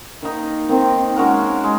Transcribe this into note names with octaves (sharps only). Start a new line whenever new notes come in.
D#3 A#3 D#4
D#3 A#3 C4 D#4
G#3 C#4 F#4 A#4
G#3